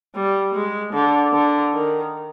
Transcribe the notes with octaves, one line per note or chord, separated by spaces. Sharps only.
G3
G#3
D3
D3
D#3